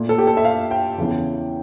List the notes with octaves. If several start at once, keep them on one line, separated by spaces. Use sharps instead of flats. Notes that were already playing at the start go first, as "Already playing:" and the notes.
Already playing: A#2 A3
A4
G4
A4
E5
F5
G5
E2 C#3 E3